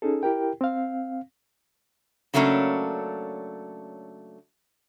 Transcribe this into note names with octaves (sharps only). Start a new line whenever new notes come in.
C#4 D#4 G#4 A4
E4 G4 A#4 G5
C4 F5
C#3 F#3 A3 A#3 C#4 D4